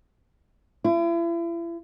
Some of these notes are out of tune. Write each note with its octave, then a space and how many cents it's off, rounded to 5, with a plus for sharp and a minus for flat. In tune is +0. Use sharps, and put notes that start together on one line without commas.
E4 +40